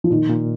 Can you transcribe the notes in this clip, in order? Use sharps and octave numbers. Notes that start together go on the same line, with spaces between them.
F3
A#2 D#3
A#2